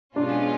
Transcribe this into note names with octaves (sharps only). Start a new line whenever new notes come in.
B2 G#3 C#4 D4 F4